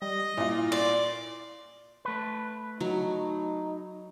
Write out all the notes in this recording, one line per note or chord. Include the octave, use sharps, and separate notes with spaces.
G3 D#5
A#2 E4 F4
D5 C6
A3 B4
F#3 D#4